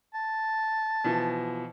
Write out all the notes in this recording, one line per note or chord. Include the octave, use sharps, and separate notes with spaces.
A5
B2 E3 F3